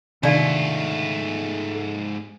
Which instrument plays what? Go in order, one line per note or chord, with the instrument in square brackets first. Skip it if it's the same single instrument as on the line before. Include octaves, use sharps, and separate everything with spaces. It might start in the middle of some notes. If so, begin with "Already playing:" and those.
[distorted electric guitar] G#2 F4 [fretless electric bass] C3 D#3 [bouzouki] A3 [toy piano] D4 D5 F5